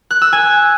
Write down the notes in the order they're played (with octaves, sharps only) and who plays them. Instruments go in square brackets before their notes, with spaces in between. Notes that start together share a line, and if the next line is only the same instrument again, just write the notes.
[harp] F#6
E6
G#5